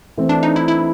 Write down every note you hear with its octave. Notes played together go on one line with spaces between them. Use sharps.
E3 A3 C4
D4
D#4
E4
E4